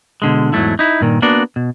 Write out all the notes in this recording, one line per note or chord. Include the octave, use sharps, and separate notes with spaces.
B2 D3 G#3
E2 G#2 F#3 G3 A3 E4
D#4 E4
G2 A#2 D#3
A#3 B3 D4 F#4 D5
B2